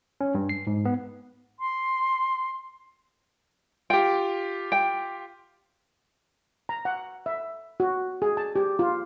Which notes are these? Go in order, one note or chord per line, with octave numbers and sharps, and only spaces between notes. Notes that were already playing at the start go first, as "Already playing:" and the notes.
C#4
G2
C7
G#2
B3
C6
F4 G4 G5
G5
A#5
F#5
E5
F#4
G#4
A5
G4
F4